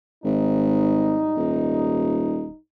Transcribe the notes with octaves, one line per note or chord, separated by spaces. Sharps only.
G#1 G#2 G3 D#4
D#1